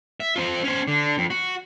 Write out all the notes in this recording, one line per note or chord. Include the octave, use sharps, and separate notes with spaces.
E5
C4 F4
C#4 C5
D3
F2
F#4